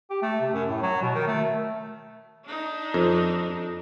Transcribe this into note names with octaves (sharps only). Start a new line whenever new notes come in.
G4
A3
C3
F#2
A2
F#3
B2
D#3
A3
D4 D#4
F2